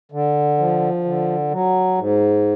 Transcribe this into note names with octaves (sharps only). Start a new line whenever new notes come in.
D3
F3
D3
F#3
G#2